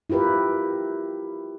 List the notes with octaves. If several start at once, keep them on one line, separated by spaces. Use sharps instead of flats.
E4 F4 G4 A#4 B4